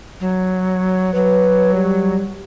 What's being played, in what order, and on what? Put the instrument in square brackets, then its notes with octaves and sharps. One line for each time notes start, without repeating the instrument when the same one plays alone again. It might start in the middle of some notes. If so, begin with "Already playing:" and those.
[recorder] F#3
[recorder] F#3 [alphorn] B4
[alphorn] G3